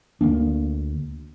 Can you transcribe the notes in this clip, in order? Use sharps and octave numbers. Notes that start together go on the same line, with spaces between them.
D2 A#3 D4